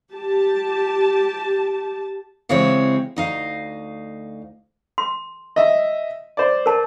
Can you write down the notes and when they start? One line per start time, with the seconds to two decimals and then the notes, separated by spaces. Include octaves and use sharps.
0.11 G4 A5
2.49 C#3 E3 G#3 C4 G4 C#5
3.16 D2 D#4 F5
4.98 C6
5.56 D#5 E5
6.37 C5 D5
6.66 A#4 A5